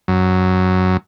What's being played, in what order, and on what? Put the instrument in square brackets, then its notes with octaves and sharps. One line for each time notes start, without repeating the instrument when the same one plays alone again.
[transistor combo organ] F#2